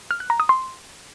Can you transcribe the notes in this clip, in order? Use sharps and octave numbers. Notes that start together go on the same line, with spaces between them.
F6
F#6
A#5
D#6
C6